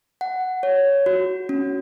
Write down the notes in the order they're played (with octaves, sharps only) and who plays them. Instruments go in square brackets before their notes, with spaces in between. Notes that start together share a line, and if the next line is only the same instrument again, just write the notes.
[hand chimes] F#5
C#5
F#4
C#4